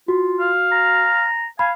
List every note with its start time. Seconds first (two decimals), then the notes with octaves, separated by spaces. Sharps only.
0.08 F4 F#4
0.40 F5
0.72 A#5
1.59 F5 G#5 B5